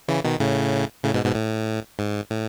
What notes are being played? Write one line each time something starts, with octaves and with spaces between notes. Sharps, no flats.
C#3 E3
B2 D#3
A2 C#3
A2 C#3
G#2 B2
G#2 B2
A2
G#2
A2